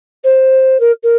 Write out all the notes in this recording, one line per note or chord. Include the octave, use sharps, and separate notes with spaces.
C5
A#4
A#4